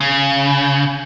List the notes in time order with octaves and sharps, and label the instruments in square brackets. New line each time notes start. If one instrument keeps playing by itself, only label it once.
[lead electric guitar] C#3